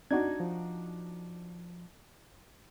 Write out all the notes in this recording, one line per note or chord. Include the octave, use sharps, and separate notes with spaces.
D4 D#4 F#4 G#6
F3